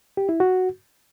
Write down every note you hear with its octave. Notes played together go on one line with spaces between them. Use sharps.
G4
E4
F#4